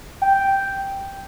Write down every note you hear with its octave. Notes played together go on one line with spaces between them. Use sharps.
G5